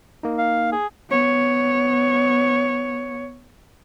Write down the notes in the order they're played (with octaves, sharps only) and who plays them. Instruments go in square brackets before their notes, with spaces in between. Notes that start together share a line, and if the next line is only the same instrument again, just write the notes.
[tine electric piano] A#3 D#4
[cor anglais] F5
G#4
[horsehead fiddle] B3 C#5